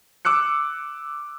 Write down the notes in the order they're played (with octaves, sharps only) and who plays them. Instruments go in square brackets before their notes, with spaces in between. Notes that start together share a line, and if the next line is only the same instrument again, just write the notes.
[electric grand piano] D6 E6 F#6 C#7